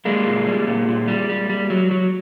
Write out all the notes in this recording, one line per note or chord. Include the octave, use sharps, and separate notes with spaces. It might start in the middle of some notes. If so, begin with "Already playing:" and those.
G3 G#3 A#3
A#2
G3
A#2
A#2
G3
G3
G3
F#3
F#3